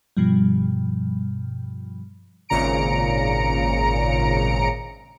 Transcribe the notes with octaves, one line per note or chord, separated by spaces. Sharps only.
G2 B2 F3 G3
G#1 A#2 C#3 A#5 C#7 D7